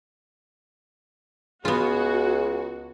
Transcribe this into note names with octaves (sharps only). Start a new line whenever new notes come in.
C#2 B3 F4 F#4 G#4